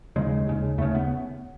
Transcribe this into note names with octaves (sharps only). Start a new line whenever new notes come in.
D#2 C#3 G#3
D#2 C#3
D#2 C#3 A3
B3